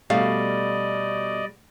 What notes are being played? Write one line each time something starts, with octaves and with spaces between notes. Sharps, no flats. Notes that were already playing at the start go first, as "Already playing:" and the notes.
B2 G3 A3 D5 D#5 F5